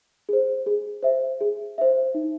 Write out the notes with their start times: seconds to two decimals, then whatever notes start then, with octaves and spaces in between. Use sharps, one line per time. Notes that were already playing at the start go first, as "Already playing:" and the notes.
0.29 G#4 C5
0.66 G#4
1.03 C5 E5
1.41 G#4
1.78 C5 E5
2.14 D#4